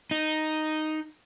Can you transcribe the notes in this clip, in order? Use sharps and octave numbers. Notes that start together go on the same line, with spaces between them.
D#4